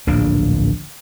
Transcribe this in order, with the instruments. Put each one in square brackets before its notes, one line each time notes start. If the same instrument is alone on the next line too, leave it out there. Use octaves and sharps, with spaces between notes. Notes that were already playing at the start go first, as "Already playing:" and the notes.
[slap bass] D1 A#1 A#3 D4